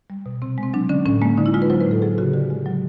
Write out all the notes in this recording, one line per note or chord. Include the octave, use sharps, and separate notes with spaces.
G3
B2
C3 C4
G#3
C4
F#3 D4
D3 C#4
A2 C#4
G#3 A#3
D3 D#4
E4
G#3 F4
B4
F#3 C5
B4
A2
A4
F#3 G#4
C#3 F#4
D3 G4
G#3
F#3